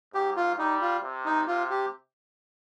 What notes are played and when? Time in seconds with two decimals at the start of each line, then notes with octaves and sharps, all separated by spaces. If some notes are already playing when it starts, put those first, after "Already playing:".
0.14 G#2 G4
0.37 F4
0.58 G3 D#4
0.82 F4
1.03 C3
1.25 D#4
1.48 C3 F4
1.70 G4